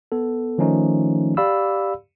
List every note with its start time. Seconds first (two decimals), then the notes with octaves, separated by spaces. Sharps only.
0.12 B3 A4
0.58 D#3 F3 A3 C#4 D#4
1.37 G4 D5 F5 B5 E6